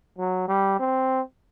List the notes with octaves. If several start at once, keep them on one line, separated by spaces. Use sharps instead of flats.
F#3
G3
C4